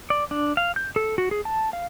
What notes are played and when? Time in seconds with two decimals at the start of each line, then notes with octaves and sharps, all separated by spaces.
0.10 D5
0.31 D4
0.57 F5
0.76 G6
0.96 A4
1.18 F#4
1.31 G#4
1.45 A5
1.73 F5